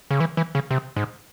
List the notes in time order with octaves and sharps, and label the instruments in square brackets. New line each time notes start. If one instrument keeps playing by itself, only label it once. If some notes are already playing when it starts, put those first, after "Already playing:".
[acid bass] C#3
E3
E3
C#3
C3
G#2